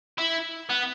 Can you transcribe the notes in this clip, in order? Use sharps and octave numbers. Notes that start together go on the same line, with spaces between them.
E4
B3